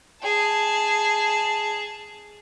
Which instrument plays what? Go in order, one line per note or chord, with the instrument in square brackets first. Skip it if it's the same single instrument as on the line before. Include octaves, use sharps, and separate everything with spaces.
[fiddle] G#4 A5